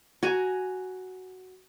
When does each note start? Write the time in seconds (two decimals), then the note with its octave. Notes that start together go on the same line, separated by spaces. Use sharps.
0.23 F#4 G#5 A#5